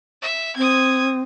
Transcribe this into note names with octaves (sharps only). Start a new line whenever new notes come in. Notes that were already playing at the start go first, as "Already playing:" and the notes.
E5
C4 D#6 G#6